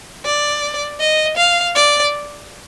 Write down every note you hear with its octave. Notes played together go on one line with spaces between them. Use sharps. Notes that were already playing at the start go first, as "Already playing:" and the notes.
D5
D#5
F5
D5